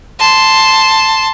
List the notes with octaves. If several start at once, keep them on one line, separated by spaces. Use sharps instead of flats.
A5 C6